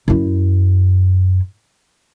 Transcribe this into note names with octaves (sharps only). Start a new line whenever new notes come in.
F#2 E4